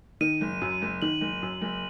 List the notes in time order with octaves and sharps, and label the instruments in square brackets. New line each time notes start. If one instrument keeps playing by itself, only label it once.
[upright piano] D#3 [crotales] D#7
[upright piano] F#1
F#2
F#1
[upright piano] D#3 [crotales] F#7
[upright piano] F#1
F#2
F#1